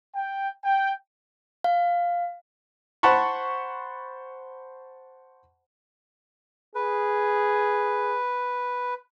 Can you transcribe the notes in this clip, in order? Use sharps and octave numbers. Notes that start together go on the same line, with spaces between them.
G5
G5
F5
C5 F#5 A5 B5 C#6
G#4 B4